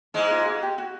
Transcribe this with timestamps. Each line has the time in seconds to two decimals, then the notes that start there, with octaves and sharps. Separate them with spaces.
0.14 G#2 G#3 E4
0.30 F4
0.45 F#4
0.63 G4
0.78 F#4